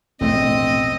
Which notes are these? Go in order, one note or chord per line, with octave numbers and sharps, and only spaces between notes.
E1 A#1 A2 C#3 C4 D#5